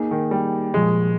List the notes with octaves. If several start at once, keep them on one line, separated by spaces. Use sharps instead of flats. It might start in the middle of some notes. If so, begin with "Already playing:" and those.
Already playing: A#3 D#4 G#4
D#3
G3
A#2 F3 G#3 G#4